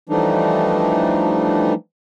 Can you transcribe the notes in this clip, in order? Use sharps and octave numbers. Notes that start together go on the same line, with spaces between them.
E3 F3 G3 A3 D4 D#4